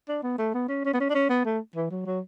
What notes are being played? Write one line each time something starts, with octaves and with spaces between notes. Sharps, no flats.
D4
B3
A3
B3
C#4
C#4
B3
C#4
D4
C#4
B3
A3
E3
F#3
F#3